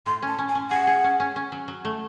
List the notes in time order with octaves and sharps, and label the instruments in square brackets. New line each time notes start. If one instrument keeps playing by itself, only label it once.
[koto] A2 [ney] C6
[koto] C#4 [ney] A5
[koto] C#4
[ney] G#5
[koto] C#4
[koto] G#4 [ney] F#5
[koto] G#4
C#4
C#4
C#4
F#3
F#3
A3